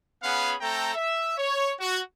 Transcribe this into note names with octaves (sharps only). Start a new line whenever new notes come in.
B3 C#4 G#4 F5 F#5 B5
A3 C4 A4 G5 A#5
E5
C#5
F#4